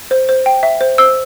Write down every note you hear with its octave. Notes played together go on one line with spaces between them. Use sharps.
C5
C5
G5
E5
C5
C5 E6